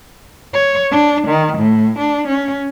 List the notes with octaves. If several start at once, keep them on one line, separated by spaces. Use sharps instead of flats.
C#5
D4
D#3
A2
D4
C#4